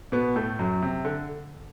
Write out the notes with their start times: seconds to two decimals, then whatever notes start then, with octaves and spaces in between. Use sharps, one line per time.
0.12 B2 B3
0.36 A2 A3
0.59 F#2 F#3
0.82 C3
1.05 D3